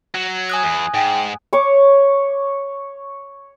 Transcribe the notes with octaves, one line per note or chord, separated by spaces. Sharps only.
F#3
G#5 D#6 F#6
E2
G#2 G5
C#5 C#6 D6